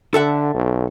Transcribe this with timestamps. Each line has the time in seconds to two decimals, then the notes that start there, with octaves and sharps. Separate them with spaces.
0.14 D3 A4 E5 F#5
0.54 B1